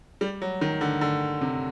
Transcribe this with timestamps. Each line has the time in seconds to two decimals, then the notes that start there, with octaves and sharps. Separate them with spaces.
0.21 G3
0.42 F#3
0.61 D#3
0.81 D3
1.01 D3
1.41 C3